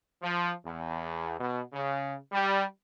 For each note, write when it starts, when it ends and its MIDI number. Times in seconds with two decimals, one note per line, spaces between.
0.22 0.52 53
0.65 1.35 40
1.40 1.60 47
1.73 2.15 49
2.32 2.63 55